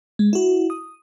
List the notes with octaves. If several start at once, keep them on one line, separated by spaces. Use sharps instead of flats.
G#3
E4 F#4
D#6